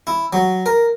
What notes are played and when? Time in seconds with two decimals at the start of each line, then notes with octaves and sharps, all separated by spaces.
0.07 E4
0.33 F#3
0.66 A#4